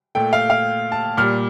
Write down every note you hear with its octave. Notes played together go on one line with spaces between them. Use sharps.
A#2 A3 G5
F5
F5
A5
A#2 G3 F6